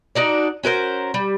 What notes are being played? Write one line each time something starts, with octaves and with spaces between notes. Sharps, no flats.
D4 D#4 F#4 D5
C#4 F#4 A#4 C5
G3